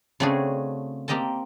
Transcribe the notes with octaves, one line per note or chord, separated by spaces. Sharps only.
C#3 A3 C4 D4 F#4 G#4
A#3 C4 G4 D#5 G5 A5